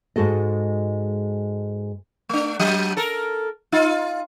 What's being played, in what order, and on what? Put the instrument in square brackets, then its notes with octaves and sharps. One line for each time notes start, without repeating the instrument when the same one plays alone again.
[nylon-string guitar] G#2 G#3 F#4 A4 D#5
[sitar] A3 D4
F#3
A4 A#4
D#4 F4